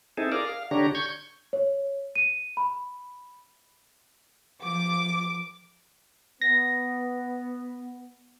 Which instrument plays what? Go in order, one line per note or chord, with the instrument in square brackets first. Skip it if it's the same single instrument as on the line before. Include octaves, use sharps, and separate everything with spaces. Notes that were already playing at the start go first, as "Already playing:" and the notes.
[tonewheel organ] C4 D#4 E4 G#4 A4
G#4 A#4 D5 F5
F5
D3 D4 G4 C#5 A#5
C#6 G6 G#6
[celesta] C#5
D#7
B5
[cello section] F3 [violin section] D6
[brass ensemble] B3 [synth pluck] A#6